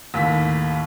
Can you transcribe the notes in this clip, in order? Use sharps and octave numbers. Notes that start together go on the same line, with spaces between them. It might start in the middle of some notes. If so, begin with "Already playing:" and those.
D#2 A2 B6